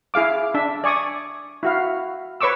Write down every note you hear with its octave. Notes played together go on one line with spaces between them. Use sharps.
E4 G#4 F5 D6
D4 E5
D5 G#5 C#6 D#6
E4 F#4 F5
B4 C#5 C#6 D6 E6